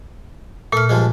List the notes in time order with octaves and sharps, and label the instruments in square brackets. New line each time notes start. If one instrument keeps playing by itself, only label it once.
[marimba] A#2 F6 [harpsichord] A3
[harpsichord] G2 F3 G#3